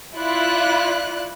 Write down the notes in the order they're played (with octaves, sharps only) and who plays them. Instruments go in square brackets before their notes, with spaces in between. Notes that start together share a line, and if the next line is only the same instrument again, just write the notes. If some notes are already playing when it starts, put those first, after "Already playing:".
[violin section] E4 F4 D5 F#6